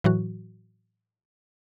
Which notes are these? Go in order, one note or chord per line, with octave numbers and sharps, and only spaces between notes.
A2 E3 F#3 F#4